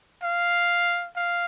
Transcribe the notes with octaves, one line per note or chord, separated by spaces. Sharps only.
F5
F5